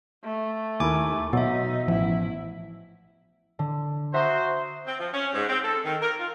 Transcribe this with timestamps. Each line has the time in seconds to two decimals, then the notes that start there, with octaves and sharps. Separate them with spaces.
0.24 A3
0.80 D#2 E4 A#4 G#5 D6
1.33 B2 F#3 B3 D#4 E5
1.88 A1 F3 E4
3.59 D3
4.14 F#4 C5 E5 A#5 D#6
4.87 C4
5.00 F3
5.14 C#4
5.34 G#2
5.49 C4
5.64 A4
5.84 D#3
6.02 A#4
6.19 F4